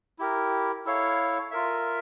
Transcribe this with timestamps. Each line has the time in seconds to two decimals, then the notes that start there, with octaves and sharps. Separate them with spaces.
0.19 E4 G4 A#4
0.85 E4 A4 C#5 F5
1.51 F4 A#4 E5